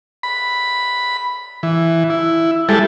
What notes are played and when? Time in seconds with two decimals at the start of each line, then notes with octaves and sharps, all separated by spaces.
0.23 B5
1.63 E3
2.10 E4
2.69 G3 G#3 E4 A4